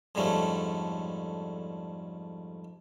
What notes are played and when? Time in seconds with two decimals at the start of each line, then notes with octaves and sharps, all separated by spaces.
0.15 F2 G#2 D3 G3 A3 C#4